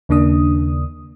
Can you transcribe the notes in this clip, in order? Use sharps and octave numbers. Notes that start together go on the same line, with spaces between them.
D#2 C#3 A#3 D4 D#6